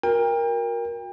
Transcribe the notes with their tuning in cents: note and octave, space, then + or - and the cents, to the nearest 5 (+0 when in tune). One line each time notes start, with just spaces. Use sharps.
F#4 -25 A#4 +10 G5 +35